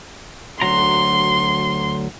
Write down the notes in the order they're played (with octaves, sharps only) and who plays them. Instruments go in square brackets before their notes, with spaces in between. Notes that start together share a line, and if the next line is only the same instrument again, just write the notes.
[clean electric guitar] D2 F#3 A#5 [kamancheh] C6